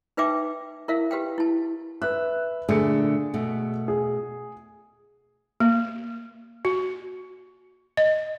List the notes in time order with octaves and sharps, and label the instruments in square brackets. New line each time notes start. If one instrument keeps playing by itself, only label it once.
[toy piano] D#4 B4 E5 G5 D6
E4 A#4 E5 F5
G4 B4 F5 G5
E4 A5
[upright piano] B4 F#6 [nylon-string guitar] E5
[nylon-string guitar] A#2 D3 A3 [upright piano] G#4 C#7
[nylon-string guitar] B2 A3
[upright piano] G#4
[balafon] A#3
F#4
D#5